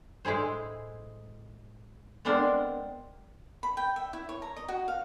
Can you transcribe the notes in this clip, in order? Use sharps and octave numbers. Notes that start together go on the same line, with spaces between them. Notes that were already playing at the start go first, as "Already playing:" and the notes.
A2 G#3 E4 G#4 C5
G#3 B3 C4 D4 A#4 C5
B5
G5
E5
E4
C#5
A#5
D#5
F#4
F5